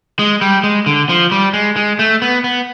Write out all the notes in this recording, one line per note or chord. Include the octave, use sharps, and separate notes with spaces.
G#3
G3
G#3
D3
F3
G3
G#3
G#3
A3
B3
B3